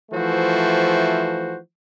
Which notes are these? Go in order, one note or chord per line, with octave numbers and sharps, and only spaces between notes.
E3 F3 A3 F#4 C5